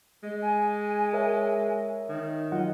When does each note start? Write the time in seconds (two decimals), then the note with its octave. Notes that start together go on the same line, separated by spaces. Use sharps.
0.23 G#3 D#5
0.42 G#5
1.13 A#4 C#5 E5
2.09 D#3
2.52 F#3 F4 D#5 F#5